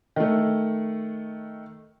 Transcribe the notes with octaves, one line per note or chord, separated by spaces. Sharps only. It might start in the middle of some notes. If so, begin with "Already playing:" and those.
D#3 A3